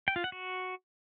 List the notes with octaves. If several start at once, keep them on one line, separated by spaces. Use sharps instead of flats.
G5
F4
F#5
F#4